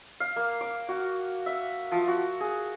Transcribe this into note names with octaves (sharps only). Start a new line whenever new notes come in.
F5
A#3
D6
F#4
E5
F3
F#4
G#4